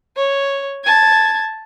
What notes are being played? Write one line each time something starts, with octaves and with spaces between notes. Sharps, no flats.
C#5
A5 G#6